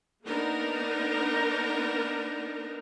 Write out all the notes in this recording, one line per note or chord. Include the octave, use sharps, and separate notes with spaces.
A#3 B3 D4 D#4 A#4